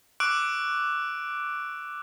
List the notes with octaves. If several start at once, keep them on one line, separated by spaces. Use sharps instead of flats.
C#6 D6 E6 F#6 D7